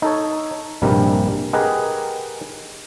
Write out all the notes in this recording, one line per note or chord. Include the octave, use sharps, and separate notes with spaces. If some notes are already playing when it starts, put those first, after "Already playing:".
D#4 A4 C#5
A#1 G2 C3 G3 A#4
G4 G#4 A#4 B4 D#5 F#5